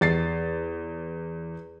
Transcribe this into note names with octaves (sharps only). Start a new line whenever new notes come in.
E2 A6 C7